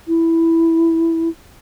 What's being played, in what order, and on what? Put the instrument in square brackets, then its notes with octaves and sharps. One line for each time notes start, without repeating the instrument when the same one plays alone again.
[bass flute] E4